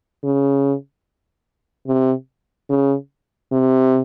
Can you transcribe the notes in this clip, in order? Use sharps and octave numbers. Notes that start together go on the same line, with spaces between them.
C#3
C3
C#3
C3